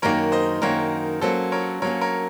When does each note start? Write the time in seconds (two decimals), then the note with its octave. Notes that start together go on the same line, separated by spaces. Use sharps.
0.02 F#2 D#3 A#3 A#4 C#5
0.32 C5 D#5
0.62 F#2 D#3 A#3 A#4 C#5
1.21 F#3 A#3 C#4 A4 C5
1.52 A#4 C#5
1.82 F#3 A#4 C#5
1.85 A#3 C#4
2.01 A#4 C#5